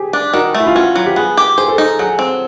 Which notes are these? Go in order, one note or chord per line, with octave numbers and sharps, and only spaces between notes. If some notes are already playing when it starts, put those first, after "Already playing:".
Already playing: G4 G#4
D4
D#3 F#4
A3
E4
F4
C#4 F#4
F#3
G4
B3 G#4
G4
G#4 C5
A4
D#4 G#4
F#3 G#4
C4